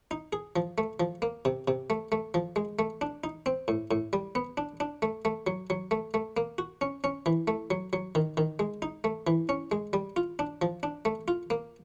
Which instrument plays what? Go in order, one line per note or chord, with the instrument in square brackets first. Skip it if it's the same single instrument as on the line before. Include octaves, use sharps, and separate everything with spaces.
[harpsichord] D#4
G#4
F3
A3
F3
A#3
C3
C3
A3
A3
F3
G#3
A3
D4
D#4
C4
A2
A2
G3
B3
D4
D4
A3
A3
F#3
F#3
A3
A3
A#3
F#4
C#4
C#4
E3
A3
F#3
F#3
D#3
D#3
G#3
D#4
A3
E3
C#4
G#3
G3
F4
D4
F3
D4
A3
F4
A#3